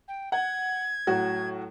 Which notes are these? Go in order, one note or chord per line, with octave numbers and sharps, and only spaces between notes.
G5
F#5 G#6
A2 F#3 F#4